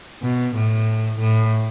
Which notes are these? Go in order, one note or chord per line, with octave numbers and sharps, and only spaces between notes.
B2
A2
A2